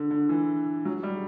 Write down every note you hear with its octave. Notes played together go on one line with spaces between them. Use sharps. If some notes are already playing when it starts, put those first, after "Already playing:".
Already playing: D3
D3
E3
F#3
G3